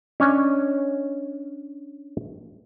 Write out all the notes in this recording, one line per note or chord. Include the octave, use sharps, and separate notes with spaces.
C#4 D4 C#5 D#5 G#5